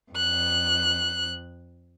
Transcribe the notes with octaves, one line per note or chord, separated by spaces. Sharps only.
F2 F#6